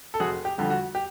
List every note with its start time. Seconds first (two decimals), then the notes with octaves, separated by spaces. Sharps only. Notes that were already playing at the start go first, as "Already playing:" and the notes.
0.14 A4
0.20 F1 F#4 G#4
0.45 G4
0.58 F2 D3 G3
0.70 F#4
0.95 G4